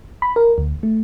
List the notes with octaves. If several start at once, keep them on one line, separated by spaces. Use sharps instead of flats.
B5
A#4
D2
A3